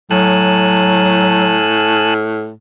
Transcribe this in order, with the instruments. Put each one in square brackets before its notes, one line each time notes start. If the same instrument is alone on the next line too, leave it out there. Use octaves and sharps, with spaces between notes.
[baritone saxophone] A2 [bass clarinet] F#3 [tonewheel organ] G#5 A5 F#6